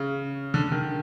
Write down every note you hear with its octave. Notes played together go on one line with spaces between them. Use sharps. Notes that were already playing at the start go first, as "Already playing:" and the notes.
Already playing: C#3
D3
D#3